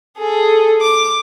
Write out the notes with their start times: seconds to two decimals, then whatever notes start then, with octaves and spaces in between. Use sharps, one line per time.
0.18 G#4 A4
0.81 D6